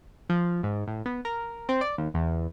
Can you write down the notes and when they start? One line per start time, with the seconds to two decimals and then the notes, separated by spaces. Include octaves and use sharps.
0.29 F3
0.63 G#2
0.88 A2
1.06 B3
1.25 A#4
1.69 C4
1.81 D5
1.98 D#2
2.14 E2